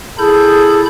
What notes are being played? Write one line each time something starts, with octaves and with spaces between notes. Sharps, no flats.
E4 G#4 A4 B5 G6